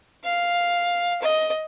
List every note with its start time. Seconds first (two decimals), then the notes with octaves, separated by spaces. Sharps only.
0.24 F5
1.22 D#5